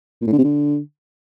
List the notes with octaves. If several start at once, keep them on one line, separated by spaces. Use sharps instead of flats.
A#2
A2
D3
C3
D3